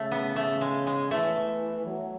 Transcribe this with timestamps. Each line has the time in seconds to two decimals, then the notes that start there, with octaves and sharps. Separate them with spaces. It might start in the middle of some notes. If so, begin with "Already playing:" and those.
Already playing: C#3 A3
0.11 B3
0.36 C#3 A3
0.61 G#3
0.87 G#3
1.11 E3 A3
1.87 F#3